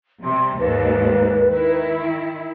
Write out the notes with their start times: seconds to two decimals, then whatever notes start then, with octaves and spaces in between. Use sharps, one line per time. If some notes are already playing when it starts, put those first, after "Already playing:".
0.24 C3 G3 C6
0.59 D#2 G#2 B4
1.48 D#3 E4